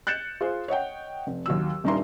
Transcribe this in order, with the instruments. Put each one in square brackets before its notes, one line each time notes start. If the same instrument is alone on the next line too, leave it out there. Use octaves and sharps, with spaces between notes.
[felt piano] F#6 G6 A6 C#7 E7
F4 G#4 C5
C#5 D#5 F#5 G5
F1
D#2 F#3 E6
D#1 G2 D#3 E5 A#5 C6